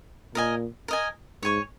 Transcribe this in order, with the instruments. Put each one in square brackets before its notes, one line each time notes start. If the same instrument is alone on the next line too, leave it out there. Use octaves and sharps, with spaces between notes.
[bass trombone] A#2 [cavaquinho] A#4 D#5 G#5
[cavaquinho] A#4 D#5 G#5
[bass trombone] G#2 [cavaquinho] C#5 G#5 C#6